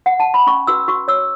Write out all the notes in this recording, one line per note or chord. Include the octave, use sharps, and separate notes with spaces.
F#5
A5
B5
C#4 C#6
F#4 B4 E6
F#4 C#6
C#5 E6